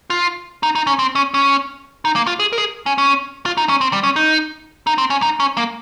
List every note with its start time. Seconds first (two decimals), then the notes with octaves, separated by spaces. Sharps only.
0.10 F4
0.63 D#4
0.75 D#4
0.87 C#4
0.99 C4
1.15 C#4
1.34 C#4
2.05 D#4
2.16 A#3
2.27 F4
2.39 G#4
2.53 A#4
2.58 G#4
2.86 C#4
2.98 C#4
3.46 F4
3.57 D#4
3.69 C#4
3.81 C4
3.93 G3
4.03 C#4
4.16 D#4
4.87 D#4
4.98 C4
5.10 C#4
5.22 D#4
5.40 C#4
5.57 A#3